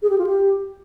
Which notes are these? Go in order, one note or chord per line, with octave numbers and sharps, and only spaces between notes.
G#4
G4
F4
G4